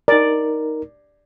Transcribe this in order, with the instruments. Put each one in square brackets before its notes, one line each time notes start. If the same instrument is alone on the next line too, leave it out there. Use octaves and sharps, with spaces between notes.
[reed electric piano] D#4 A#4 [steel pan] D5